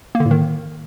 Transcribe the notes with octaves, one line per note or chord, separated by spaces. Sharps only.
A#3
D3
A2
D#3